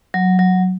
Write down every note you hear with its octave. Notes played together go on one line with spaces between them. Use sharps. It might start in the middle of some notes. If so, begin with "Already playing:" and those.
F#3
F#3